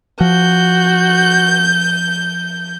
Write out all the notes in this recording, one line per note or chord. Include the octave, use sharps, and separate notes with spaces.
F3 F#4 G6